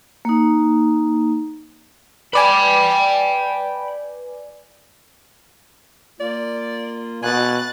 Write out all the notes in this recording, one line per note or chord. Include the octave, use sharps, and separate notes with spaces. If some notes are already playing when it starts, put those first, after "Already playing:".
A#3 D#4
B4 D5 G5 G#5 B5
A#3 F4 D5
B2 G#5 F#6 A6